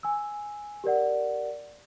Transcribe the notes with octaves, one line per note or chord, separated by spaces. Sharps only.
G#5 E6
G4 A#4 D5 F#5